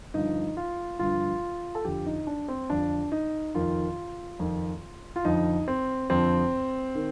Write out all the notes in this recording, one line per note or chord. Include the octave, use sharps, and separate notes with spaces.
G2 D3 F3 D#4
F4
G2 D3 F3 F4
A4
F2 D3 F3 G4
D#4
D4
C4
F2 D3 F3 D4
D#4
F2 D#3 F4
F2 D#3
F4
F2 D3 F3 D#4
C4
F2 D3 F3 C4
D#3